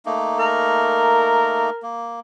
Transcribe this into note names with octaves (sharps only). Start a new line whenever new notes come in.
A3 A#3 D#4
A#4
A#3